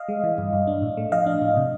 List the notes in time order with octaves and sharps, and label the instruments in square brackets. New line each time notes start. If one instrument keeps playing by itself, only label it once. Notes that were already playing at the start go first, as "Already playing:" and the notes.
Already playing: [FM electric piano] D#5 F5
G#3
E3
G2
G2
D4
A2
A3
F3 D#5 F5
D4
A2
C3